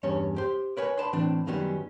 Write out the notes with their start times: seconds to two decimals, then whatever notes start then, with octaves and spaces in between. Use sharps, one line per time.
0.03 E2 G2 C#4 C#5
0.36 G4 C5
0.77 A#4 B4 C#5 G#5
0.98 B4 D5 A5 B5 C6
1.13 A2 E3 C4 D4
1.47 F#2 D#3 F#3 G3 B3 C#4